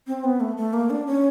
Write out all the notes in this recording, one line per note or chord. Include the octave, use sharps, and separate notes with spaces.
C4
B3
A3
A3
A#3
D4
C#4